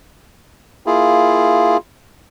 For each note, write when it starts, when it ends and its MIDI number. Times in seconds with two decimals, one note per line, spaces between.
0.86 1.77 58
0.86 1.77 64
0.86 1.77 65
0.86 1.77 68